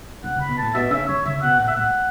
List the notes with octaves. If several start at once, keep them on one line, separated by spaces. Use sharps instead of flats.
B2 F#5
C#3 B5
B2
A2 A5
B2 E5
C#3 E5
E3 C#5
C#3 E5
B2 F#5
A2 F#5
E5
A2 F#5